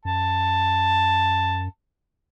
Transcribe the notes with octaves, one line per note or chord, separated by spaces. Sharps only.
F#2 A5